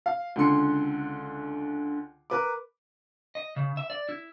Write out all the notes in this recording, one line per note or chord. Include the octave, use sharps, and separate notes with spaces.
F5
C#2 D3 C6 C#7
A#4 B4 D6
D#5
C#3
E5
D5
E4